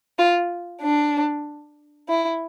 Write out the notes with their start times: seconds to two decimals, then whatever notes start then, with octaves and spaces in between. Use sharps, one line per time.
0.19 F4
0.82 D4
2.09 E4